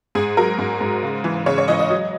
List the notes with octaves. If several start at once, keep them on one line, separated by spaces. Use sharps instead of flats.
G#2 G#4
F#3 A#4
G#2
G#2
C#3
E3
C#3 C#5
C#5
E3 D#5
D#5
F#3